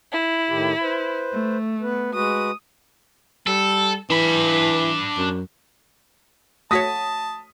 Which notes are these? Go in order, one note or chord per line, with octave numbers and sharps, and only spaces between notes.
E4
A2 D#3 G4
B4 C5
A3
B3 B4
G#3 F#4 B4 D#6
G3 A4
E3 D4 B5
F#2
A3 F#4 C#5 A5 D#6 A#6 B6